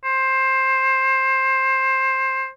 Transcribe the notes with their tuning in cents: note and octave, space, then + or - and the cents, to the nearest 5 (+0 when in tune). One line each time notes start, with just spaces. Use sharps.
C5 +20